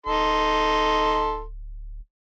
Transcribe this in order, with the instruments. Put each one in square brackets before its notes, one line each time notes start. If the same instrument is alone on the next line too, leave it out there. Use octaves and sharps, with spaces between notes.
[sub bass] D1 [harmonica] D#4 A4 C6